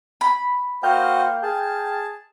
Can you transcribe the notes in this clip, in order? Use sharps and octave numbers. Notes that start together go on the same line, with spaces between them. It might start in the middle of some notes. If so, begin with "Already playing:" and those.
B5
A#3 F#4 C5 D#5 G5 F6 G6
G#4 A5